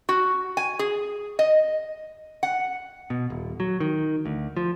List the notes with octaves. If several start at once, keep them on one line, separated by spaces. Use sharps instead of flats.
F#4
G#5
G#4
D#5
F#5
B2
D#1
F#3
D#3
D2
F3